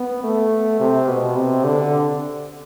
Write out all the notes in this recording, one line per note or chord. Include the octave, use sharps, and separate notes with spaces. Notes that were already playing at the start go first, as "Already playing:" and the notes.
Already playing: B3
A3
C3
B2
C3
D3